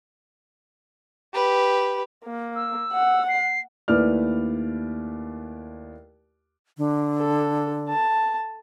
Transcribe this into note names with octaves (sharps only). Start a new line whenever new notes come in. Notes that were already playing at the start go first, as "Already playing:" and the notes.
G4 B4
A#3
E6
F#5
C7
D#2 A3 E4 B4 D5 F6
D3
A4
A5